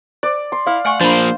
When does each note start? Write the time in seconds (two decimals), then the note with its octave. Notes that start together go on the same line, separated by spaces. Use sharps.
0.23 C5 D5
0.52 C6
0.67 E4 F5
0.85 A3 F#5 G#5 C#6
1.01 F3 A#3 D4 C5 B5